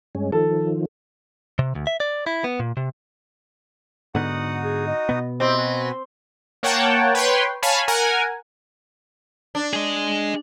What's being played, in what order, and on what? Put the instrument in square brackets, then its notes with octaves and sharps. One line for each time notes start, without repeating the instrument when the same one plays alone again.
[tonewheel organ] G2 G#3 C#4
[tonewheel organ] D#3 F3 [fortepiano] A4
[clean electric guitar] C3
D2
E5
D5
E4
B3
A#2
C3
[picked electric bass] G#2 D3 B3 [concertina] D#4 F#4 D#6 [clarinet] F#5
[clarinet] G#4
D#5
[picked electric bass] B2 B3
[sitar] C4 [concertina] E4 G4 [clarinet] D#5
[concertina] F#4 B4 G#5
[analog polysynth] A#3 C#5 F#5 G5 A5
B4 C#5 G5 C6
C#5 F5 G#5 A5 B5
A#4 F#5 G#5
[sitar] D4
[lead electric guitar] G#4 D#5